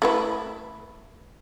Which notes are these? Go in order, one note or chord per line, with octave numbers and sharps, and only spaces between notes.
A3 E4 B4